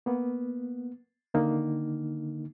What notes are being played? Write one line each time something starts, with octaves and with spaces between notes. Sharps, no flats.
A#3 B3
D3 D#3 A#3 D#4